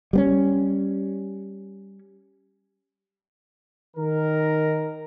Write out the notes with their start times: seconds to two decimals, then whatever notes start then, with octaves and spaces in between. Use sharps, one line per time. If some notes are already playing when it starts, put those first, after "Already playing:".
0.13 G3 B3 C#4
3.96 D#3 A#4